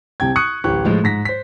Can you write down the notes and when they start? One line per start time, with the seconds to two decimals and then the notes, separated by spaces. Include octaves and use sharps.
0.20 C2 C3 G5 G#6
0.36 C#6 D#6 F#6 C#7
0.64 D1 A1 G4 C#6 F#6
0.85 A2 F3 G#3 F4
1.04 G#2 A#6 B6
1.25 C5 B6